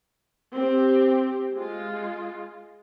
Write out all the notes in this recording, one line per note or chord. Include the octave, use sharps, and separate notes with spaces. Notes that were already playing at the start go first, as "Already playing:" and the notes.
C4 G4
G#3 F4